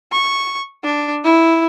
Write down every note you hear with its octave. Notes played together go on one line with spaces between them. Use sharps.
C#6
D4
E4